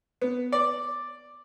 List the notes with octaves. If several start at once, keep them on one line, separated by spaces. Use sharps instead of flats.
B3
D5